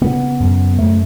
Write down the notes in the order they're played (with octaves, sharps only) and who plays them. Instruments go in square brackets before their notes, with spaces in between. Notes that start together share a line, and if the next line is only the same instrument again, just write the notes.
[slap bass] C#3 B3
F#2
F#2 A3